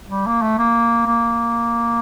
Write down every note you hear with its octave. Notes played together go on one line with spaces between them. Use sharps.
G3
A#3
A3
A#3
A#3